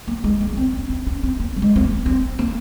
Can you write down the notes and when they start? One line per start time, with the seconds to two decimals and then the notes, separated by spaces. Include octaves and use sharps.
0.08 A#3
0.24 G#3
0.41 A#3
0.53 C#4
0.57 C4
0.73 C#4
0.90 C4
1.07 C#4
1.23 C4
1.40 A#3
1.56 F#3
1.62 G#3
1.76 C4
1.84 A#3
2.06 C4
2.39 A#3